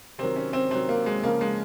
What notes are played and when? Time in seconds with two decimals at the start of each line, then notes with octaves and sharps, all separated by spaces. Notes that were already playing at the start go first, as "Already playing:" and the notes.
0.18 C3 D#3 F#3 C4
0.36 C#4
0.53 C4
0.71 C3 D#3 F#3 C4
0.89 A#3
1.06 G#3
1.23 C#3 F3 A#3
1.41 G#3